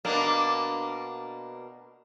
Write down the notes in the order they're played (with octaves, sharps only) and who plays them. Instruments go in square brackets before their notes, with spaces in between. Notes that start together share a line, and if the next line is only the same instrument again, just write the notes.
[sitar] B2 A#3 D4